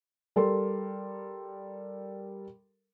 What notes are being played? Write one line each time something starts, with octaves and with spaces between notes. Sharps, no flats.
G3 A4 A#4 C6